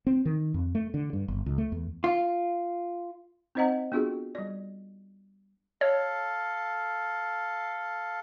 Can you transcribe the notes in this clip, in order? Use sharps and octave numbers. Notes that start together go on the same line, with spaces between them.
C4
D#3
F2
A3
D3
G2
G1
C#2
A3
E2
F4
C4 D#4 C5 D#5 F#5 A#5
B3 D4 F4 F#4 G#4 A4
G3 D5
A4 C#5 F5